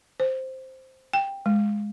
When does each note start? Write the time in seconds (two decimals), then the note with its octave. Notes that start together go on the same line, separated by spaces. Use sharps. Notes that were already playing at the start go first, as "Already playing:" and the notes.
0.20 C5
1.13 G5
1.46 G#3